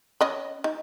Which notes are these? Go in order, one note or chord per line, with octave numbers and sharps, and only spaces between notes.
C#4 D#5 B5
D#4